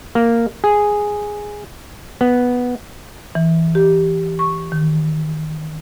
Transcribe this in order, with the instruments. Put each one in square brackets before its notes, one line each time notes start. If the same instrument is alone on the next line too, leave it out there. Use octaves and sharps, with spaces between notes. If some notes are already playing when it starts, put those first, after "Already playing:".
[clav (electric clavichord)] A#3
G#4
B3
[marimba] E3
G4
C#6
D#3